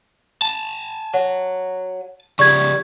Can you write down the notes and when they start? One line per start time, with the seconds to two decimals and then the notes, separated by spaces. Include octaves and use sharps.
0.42 G#5 A5
1.14 F#3
2.39 C#3 F3 G3 C#6 G#6